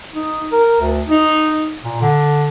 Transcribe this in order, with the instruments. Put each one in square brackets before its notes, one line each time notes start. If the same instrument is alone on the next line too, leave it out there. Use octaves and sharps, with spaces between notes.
[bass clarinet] D#4
A#4
D2
D#4
A#2
D3